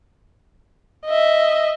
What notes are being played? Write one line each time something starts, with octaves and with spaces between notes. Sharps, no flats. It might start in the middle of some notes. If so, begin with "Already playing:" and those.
D#5 E5